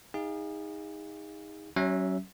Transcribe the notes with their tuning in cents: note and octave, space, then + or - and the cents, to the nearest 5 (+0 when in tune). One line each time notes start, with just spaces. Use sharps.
D#4 +20 G#4 -30 F5 +0
F#3 +25 C#4 +0 E5 +0